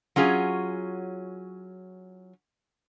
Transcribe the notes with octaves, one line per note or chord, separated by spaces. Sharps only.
F#3 C#4 F4 G#4